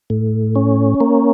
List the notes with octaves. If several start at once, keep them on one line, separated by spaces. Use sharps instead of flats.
A2
C#4
A#3